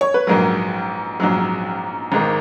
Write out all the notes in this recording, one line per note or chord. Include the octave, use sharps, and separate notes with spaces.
C#5
B4
A#1 G#2 F#3 A#4
A#1 G#2 F#3
G#1 G#2 D#3